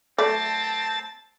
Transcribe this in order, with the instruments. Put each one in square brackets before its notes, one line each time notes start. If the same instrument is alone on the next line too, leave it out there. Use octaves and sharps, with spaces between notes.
[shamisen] F#3 A3 D5 [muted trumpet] C4 [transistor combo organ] A5